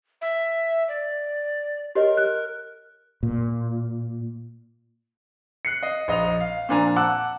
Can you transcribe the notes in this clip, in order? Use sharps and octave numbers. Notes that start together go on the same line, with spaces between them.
E5
D5
G4 A#4 C#5 D#5
F#6
A#2
F#6 C7 C#7
D#5
A#1 D#5 D#6 F7
F5
A#2 F3 D4 D5 G#5 A#5
F#5 A5 D6 E6 F#6